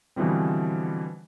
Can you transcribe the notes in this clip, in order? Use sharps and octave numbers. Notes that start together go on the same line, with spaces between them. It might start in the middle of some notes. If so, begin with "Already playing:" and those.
B2 D3 E3 F3 G3 C4